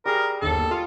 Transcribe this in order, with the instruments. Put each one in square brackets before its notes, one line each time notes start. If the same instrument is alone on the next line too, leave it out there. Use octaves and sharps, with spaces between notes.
[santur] G3 G#4 D#6 [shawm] A#4
[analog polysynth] G1 D#2 [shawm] A4
[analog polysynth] F4